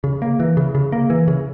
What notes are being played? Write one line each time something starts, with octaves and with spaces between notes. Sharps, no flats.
C#3
A#3
E3
C#3
C#3
A#3
E3
C#3